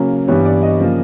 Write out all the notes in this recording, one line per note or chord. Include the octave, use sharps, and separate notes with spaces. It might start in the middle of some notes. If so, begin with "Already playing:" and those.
Already playing: C#3 F#3 A#3
G2 E3 G3 B3 C#5
D5
D#5
C#3 F3 A#3